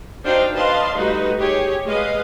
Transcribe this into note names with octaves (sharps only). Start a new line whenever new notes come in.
D4 D#4 F#4 C5 F5 G5
B4 D5 D#5 F5 A5 C6
G3 A3 D#4 F#4 B4
G4 G#4 C#5
G#3 B4 D#5 F5